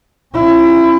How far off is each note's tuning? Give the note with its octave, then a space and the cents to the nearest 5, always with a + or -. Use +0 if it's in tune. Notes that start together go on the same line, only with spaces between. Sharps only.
C#4 -35 E4 +30